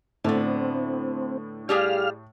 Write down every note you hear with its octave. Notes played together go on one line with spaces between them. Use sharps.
A2 D3 A3 B3 C4
G3 G4 G#4 F5 F6